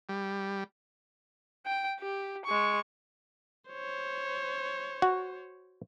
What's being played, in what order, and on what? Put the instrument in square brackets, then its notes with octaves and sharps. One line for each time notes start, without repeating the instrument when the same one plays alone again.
[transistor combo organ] G3
[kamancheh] G5
G4
G#3 C#6
[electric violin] C5 C#5
[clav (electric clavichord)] F#4